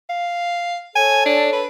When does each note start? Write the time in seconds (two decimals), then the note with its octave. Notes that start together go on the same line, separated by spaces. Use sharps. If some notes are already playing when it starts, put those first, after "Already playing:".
0.10 F5
0.95 A4 C#5 G#5
1.26 D4
1.52 B4